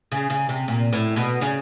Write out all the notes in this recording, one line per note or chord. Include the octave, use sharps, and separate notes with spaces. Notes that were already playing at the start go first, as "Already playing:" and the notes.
C#3
C#3
C3
A#2
A2
B2
C#3